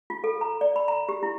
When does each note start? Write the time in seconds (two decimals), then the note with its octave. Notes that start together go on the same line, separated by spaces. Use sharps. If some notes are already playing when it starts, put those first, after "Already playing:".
0.10 F4
0.24 A4
0.41 A#5
0.61 D5
0.76 B5
0.88 A#5
1.09 G4
1.23 E4